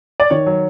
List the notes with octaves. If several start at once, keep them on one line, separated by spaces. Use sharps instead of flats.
D5
D#3 C#5
F#3